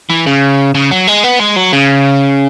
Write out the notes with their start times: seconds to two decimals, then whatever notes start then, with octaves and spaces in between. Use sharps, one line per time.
0.10 E3
0.26 C#3
0.75 C#3
0.91 F#3
1.07 G#3
1.24 B3
1.40 G#3
1.56 F#3
1.73 C#3